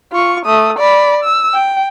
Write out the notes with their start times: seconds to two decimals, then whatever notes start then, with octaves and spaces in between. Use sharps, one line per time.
0.12 F4 C#6
0.46 A3 D#6
0.79 D5 B5
1.24 E6
1.54 G5